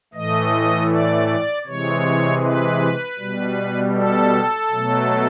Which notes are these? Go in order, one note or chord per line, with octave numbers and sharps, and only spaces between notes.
A2 E3 A3 D#5
D5
C3 E3 G#3 C#5
B4
B2 G3
A4
B2 F#3 A3